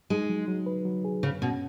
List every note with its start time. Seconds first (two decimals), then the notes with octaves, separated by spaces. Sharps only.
0.10 G#3 D#4
0.29 F#3
0.48 F#3
0.66 B4
0.85 F#3
1.05 G#4
1.23 F#2 C#3
1.42 B2 C#4